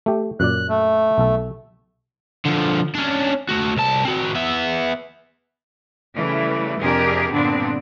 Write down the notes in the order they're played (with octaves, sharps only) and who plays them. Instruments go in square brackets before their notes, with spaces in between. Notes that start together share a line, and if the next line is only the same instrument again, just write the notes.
[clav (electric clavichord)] A3 G4
[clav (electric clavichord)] F#2 A#2 D5 [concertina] F#6
[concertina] A3
[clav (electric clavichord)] B1 A4
[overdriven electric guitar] D3 F3
C#4 D4
A3 F#4
C2 A5
C4 F#4
B3 E5
[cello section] C#3 E3 G3 A3
F2 C3 D4 G4 G#4 A#4
G2 A#2 D3 B3 C4 D4